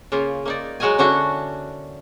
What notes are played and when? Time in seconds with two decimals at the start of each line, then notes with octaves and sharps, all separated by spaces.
0.12 C#3 A#3 F4
0.45 A#3 D#4 D5
0.80 F#3 G#3 F#4 A#4 D#5 G#5
0.98 D3 C#4 D4 E4 F#4